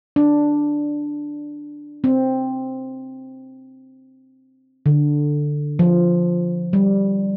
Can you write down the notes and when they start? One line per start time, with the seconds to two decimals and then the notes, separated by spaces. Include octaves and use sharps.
0.16 D4
2.04 C4
4.86 D3
5.79 F3
6.73 G3